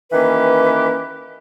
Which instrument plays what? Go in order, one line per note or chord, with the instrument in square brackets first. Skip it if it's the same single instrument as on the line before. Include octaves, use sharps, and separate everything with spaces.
[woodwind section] D#3 E3 A#3 C#4 G4 B4